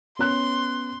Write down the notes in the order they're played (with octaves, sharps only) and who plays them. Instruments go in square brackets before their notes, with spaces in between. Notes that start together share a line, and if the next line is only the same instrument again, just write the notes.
[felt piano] B3 C#4 F#6 [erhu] C6